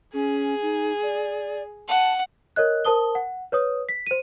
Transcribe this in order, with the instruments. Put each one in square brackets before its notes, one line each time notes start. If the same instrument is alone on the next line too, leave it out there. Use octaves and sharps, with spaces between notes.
[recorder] C#4 [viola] G#4
[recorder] D#4
D5
[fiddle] F#5 [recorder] A5
[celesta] A#4 C#5 D#5 F#6
A#4 C5 A5 D#6 G7
F#5
B4 C#5 D#6
B6
C5 D#7